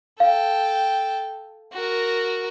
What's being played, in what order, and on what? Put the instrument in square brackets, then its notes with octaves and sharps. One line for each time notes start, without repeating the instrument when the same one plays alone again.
[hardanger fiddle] A4 G5 [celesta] F5
[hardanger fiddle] F#4 A#4